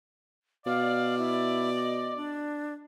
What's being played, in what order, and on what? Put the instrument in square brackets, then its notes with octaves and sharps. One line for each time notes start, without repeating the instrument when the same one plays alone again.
[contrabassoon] B2 [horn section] D5 [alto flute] F5
[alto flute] E4
D#5
D4